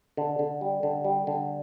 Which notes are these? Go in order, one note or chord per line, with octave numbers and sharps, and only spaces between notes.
D3
D3
G3
D3
G3
D3